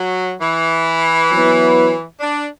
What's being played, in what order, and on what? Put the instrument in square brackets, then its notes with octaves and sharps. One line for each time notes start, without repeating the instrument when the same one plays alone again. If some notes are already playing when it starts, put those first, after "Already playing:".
Already playing: [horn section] F#3
E3
[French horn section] F#3 B3 E4 B4
[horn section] D4